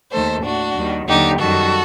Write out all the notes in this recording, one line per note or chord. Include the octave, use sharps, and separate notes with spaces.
D#2 D#3 A3 A4 C5
A2 A3 D4 F#4
D#2 D#3 G3
D#2 D3 F#3 D#4 G4
F#2 D#3 G3 F#4 A4